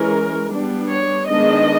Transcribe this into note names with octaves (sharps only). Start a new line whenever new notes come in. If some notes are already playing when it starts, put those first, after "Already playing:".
Already playing: E3 G#3 C#4 A#4
G3 B3 D4
C#5
D#3 G#3 B3 D4 D#5